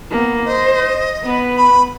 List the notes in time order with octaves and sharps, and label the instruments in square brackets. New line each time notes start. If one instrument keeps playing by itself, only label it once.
[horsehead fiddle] A#3 B3
[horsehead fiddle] C5 [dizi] D#5
[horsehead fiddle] B3 B4
[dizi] B5